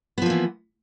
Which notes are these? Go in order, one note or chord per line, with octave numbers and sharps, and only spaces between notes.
E3 F3 A#3 B3